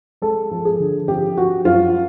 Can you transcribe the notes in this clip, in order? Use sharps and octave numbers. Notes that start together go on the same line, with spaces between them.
G#3 A4
F3
G#4
D3
F3 G4
F3 F#4
F#2 F4